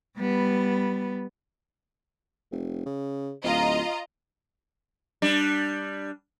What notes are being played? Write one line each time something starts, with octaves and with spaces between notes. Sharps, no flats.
G3 B3
F1
C#3
D1 F4 D#5 A#5
G3 D4